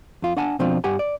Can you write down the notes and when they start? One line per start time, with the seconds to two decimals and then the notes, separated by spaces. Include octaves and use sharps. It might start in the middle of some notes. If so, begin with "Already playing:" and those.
0.22 F2 F4
0.37 D4 F#5 G#5 A5
0.59 B2 F3 C4 D4 F4
0.84 G2 G4 F#5 G#5
0.99 D5